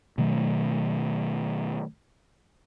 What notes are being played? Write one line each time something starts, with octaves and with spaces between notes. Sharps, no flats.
B2 D#3 F#3 A3